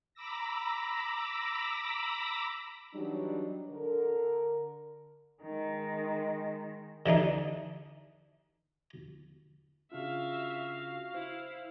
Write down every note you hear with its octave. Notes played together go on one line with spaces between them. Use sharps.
A#5 B5 D6 E6 A#6
E3 F#3 G3 D4 D#4
D3 A#4
D#3 G#3
D3 E3 D4 D#4
C#3 D4 F4 F#4 E5 F5
E4 C5